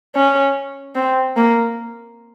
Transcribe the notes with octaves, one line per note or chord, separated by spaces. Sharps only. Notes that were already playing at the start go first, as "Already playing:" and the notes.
C#4
C4
A#3